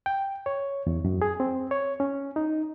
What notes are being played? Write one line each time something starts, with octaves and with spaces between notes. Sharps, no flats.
G5
C#5
E2
F#2
G#4
C4
C#5
C#4
D#4